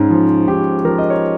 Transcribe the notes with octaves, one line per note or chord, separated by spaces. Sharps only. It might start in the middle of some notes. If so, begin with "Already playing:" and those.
Already playing: G#2 C#4
F3
G#2 G4
F3 A#4
D#5
C#5